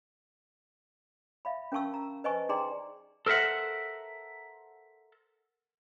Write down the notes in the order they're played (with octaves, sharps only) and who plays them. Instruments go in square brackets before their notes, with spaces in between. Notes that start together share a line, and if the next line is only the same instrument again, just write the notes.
[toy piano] E5 F5 B5
C#4 A#4 F5 A5 C#6 E6
A#5
B4 C5 D#5 G#5 A5 C#6
D#4 G#4 D5 G5 A#5 C6
[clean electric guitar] A4 A#4 C5 E5 F#5